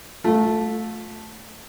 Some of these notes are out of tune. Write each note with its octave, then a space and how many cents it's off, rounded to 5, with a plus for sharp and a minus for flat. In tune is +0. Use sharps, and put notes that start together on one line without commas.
A3 -5 F4 +30